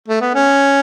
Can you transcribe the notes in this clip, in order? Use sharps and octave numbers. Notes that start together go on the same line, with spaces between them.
A3
B3
C#4